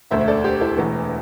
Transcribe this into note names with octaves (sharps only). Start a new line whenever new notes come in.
E1 D2 D3 A3 C5 E5
E5
A4 D5
G4 C5
E4 A4
E1 E2 E3 A3